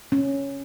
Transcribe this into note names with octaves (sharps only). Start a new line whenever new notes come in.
C#4